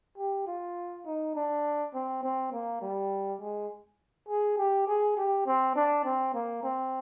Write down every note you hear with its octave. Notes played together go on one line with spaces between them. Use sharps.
G4
F4
D#4
D4
C4
C4
A#3
G3
G#3
G#4
G4
G#4
G4
C4
D4
C4
A#3
C4